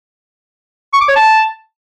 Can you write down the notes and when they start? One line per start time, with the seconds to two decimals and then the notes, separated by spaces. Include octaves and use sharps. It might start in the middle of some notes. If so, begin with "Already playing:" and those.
0.93 C#6
1.01 D6
1.08 C#5
1.16 A5